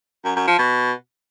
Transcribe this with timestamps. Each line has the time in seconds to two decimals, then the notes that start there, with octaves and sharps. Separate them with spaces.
0.25 F#2
0.36 F#2
0.47 F3
0.59 B2